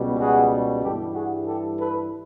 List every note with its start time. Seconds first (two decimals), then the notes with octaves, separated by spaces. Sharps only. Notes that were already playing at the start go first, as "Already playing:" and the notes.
Already playing: C#2 B2 G3
0.19 F#4 G#4
0.83 G2 E3 G3 G4 A4
1.14 F#4 G#4
1.47 G4 A4
1.78 A4 B4